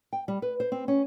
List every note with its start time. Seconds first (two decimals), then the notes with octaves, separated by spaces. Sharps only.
0.13 G5
0.28 G3
0.42 B4
0.60 C5
0.72 C4
0.88 C#4